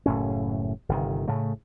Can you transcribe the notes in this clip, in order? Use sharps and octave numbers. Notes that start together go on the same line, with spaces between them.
F#1 A2 C#4
G1 C3 D#3
A2 C#3 A3